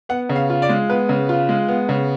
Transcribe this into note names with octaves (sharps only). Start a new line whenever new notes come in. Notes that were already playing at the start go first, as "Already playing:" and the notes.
B3 F#5
C#3
F5
F4
D5
G#3
B3 B4
C#3
F4
G#3
B3
C#3